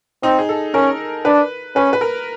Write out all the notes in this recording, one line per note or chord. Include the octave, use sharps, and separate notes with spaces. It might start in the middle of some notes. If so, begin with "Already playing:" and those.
C4 D#4
G#4
A4
C#4 A#4
D4 B4
C#4 B4
B4
A#4